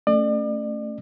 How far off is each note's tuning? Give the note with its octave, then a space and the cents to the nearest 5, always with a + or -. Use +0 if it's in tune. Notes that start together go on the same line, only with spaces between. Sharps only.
A3 +10 C#4 +0 D5 +40